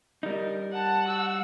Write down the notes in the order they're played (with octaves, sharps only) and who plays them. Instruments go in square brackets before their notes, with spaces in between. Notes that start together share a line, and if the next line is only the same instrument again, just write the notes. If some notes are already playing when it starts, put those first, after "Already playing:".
[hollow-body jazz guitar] G3 D#4 [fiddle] A#4
[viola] F#5 [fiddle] A5
[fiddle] F#4 E6